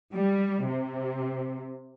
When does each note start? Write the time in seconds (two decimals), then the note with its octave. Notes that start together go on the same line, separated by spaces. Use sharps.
0.14 G3
0.65 C3